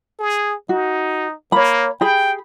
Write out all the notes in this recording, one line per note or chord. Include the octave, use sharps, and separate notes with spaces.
G#4
D#4 F#4
A#3 C#5 B5
G4 G#4 G5 B5